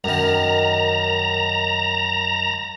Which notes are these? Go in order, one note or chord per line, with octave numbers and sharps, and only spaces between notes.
F#2 D#3 A#5